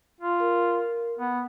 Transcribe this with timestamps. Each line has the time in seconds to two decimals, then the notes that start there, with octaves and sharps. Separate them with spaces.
0.21 F4
0.40 A#4
1.19 B3